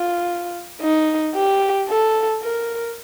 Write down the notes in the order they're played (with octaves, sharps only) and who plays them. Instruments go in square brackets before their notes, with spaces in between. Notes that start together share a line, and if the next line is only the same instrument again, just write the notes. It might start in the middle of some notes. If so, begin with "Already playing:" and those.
Already playing: [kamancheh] F4
D#4
G4
A4
A#4